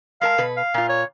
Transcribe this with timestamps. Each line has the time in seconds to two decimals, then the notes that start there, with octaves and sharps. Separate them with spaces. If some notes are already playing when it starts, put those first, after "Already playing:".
0.21 G#3 A#4 F5 A5
0.38 B2 B4
0.57 F5
0.74 A#2 F4
0.89 C#5